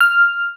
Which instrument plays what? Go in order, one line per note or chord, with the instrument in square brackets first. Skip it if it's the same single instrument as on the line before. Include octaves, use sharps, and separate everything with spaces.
[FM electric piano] F6